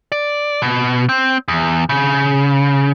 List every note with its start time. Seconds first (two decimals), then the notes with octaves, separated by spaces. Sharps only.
0.12 D5
0.62 B2
1.09 C4
1.48 E2
1.89 C#3